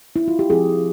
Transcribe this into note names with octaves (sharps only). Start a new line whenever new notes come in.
E4
F4
G4
F3 C4 E4 G#4